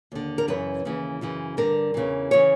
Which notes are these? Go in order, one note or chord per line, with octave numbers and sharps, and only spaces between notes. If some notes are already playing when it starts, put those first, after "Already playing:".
D#2 D3
A#4
F#2 C#3 E3 B4
D#2 C#3 E3
F#2 C#3 E3
G2 D3 A#4
E2 C#3 E3
C#3 E3 C#5